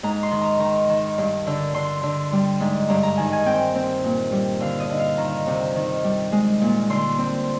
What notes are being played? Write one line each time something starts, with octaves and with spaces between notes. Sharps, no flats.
G#2 A#5
C6
D#3
A#5
D#3 A#5
D#3
G2
D3
D3 C6
D3
G3
G#2
G2 A#5
A#5
D#3 G#5
G#5
C4 G5
C4
A#2
G3
D3 F5
D#5
D3
F5
D#3 A#5
C3
D#3
G3
G#3
A#2
D3 C6
C4